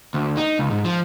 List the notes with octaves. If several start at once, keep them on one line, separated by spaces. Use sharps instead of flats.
D2
D#4
C#2
G#2
F3